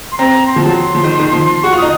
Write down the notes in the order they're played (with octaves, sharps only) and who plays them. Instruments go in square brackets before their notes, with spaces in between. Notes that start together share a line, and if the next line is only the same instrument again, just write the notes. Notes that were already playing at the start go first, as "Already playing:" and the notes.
[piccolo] C6
[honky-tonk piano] C4 [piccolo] A#5
[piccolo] C6
[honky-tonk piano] F3
[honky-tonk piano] F#3 [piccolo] A5
[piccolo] C6
[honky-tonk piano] F3
D#3
D#3
F3
[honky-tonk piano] F#4 [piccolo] C#6
[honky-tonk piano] F4
[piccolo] D#6
[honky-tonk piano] D#4